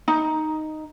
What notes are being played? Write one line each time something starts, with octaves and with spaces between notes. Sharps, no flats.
D#4